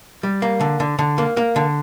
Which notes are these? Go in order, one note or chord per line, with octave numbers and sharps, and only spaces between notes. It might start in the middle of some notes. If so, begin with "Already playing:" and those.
G3
A#3
D3
D3
D3
A#3
A#3
D3